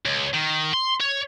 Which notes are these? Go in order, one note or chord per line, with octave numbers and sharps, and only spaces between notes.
C#2
D#3
C6
C#5